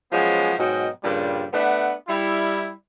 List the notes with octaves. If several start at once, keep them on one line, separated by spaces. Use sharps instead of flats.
F3 F#3 G#3 B3 C#4
G#2 B2 F#3 D#5 G5
G2 A#2 C#3 F3 G3
A3 B3 D4 B4 F#5
G3 E4